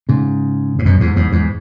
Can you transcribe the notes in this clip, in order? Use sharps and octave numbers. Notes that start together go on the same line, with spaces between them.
G#2 C#3
G#2
F#2 B2
E2 G#2
E2 G#2
E2 G#2